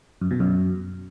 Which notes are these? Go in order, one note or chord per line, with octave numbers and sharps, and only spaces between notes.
F#2
B2
F#2